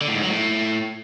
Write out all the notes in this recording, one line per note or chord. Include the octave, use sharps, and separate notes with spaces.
D3
A2
G#2
F#3
A2